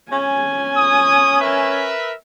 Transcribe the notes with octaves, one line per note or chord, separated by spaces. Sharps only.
C#4 G#5
D#6
A#4 B4 E5